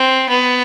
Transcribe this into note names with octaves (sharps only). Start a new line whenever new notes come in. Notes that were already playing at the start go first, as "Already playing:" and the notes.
Already playing: C4
B3